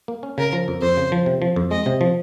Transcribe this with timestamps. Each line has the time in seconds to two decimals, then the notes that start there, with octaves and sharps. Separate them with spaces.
0.08 A#3
0.23 C#4
0.38 C#3 A#4
0.53 F3
0.68 F2
0.82 F2 C5
0.97 C#3
1.12 F3
1.26 C3
1.42 F3
1.56 F2
1.71 G#3 D#5
1.86 C3
2.01 F3